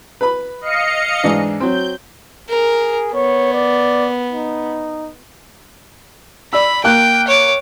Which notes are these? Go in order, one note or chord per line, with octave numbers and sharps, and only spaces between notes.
B4 B5
D#5 F5 C#7
G#2 E3 D4
F#3 C4 G6
G#4 A#4
B3 C#5
D5
D#4
D5 B5 E6
A#3 G5 F#6
C#5 D6